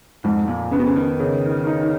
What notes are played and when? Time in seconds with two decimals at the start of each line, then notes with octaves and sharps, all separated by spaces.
0.24 F2 G#2
0.48 A#2
0.71 C#3 B3
0.79 B2
0.86 C#3
0.96 D#3
1.20 C#3
1.67 D#4